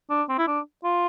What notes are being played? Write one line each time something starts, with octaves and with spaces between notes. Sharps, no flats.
D4
C4
E4
D4
F4